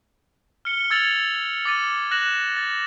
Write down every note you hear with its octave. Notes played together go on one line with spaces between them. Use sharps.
F6 C#7 G7
E6 G#6 A6 C#7 F7 F#7
D6 A6 D#7
F#6 A#6 E7 F#7
A6